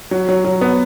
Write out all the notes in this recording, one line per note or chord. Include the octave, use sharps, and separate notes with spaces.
F#3
F#3
F#3
B3